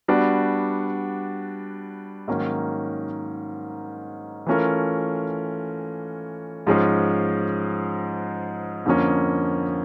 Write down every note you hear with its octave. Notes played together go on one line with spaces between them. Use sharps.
G3 B3 D4 F#4
G#2 D#3 F#3 A#3 C#4
E3 A3 C#4 F4 A#4
G#2 F3 G#3 C#4
F2 D3 F3 A#3 C#4